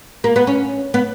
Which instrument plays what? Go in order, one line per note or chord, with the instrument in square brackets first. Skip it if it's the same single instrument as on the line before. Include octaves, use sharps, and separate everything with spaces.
[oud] A#3
B3
C#4
B3